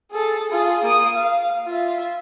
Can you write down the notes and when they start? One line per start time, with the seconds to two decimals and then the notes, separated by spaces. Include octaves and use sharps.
0.12 G#4 A4
0.51 F4 G#4
0.84 A#3 D#6
1.16 F5
1.66 F4 E5